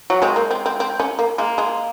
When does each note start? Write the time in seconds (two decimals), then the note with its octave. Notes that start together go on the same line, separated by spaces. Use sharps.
0.10 F#3
0.22 G#3 C4
0.36 A#3
0.51 C4
0.66 C4
0.80 C4
1.00 C#4
1.19 A#3
1.38 G#3 A#3
1.58 G#3